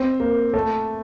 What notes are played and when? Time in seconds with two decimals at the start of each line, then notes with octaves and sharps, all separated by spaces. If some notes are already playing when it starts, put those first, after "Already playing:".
Already playing: C4
0.20 A#3
0.54 A3